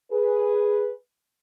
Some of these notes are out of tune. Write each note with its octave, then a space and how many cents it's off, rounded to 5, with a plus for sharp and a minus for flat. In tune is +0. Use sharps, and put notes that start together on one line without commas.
G#4 +0 B4 -5